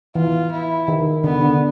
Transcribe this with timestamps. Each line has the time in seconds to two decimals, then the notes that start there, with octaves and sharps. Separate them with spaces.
0.15 E3 F4
0.51 E4
0.88 D#3
1.24 D3 B3
1.41 D3